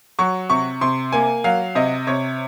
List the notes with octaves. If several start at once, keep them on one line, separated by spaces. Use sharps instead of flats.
F#3 C#6
C3 C#6
C3 C6
A#3 G#5
F#3 F5
C3 D#5
C3 C#5